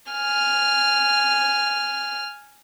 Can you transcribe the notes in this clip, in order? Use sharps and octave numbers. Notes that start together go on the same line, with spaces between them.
G#5 F6